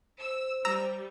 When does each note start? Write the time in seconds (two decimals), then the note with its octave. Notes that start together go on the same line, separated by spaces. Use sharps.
0.19 C5 E6
0.65 G3 A#5 E6 A#6